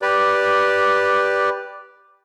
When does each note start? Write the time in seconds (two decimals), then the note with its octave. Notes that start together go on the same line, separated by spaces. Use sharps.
0.02 G4 B4 D5